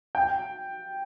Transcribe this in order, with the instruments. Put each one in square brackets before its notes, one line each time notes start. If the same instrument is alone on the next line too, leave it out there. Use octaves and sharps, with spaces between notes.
[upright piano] G5